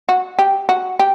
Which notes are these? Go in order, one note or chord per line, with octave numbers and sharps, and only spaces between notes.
F#4
G4
F#4
G4